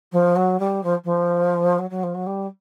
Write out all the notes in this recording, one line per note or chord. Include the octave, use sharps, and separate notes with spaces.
F3
F#3
G3
F3
F3
F#3
F#3
F3
F#3
G3